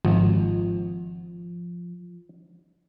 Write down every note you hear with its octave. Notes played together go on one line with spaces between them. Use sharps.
G#1 F3